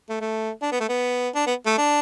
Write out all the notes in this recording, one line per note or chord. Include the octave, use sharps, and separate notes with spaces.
A3
A3
D4
B3
A3
B3
D4
B3
A3
D4